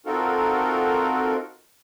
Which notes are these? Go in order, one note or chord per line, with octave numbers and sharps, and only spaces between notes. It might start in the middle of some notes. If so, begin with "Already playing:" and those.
C4 D#4 F4 F#4 A4 A#4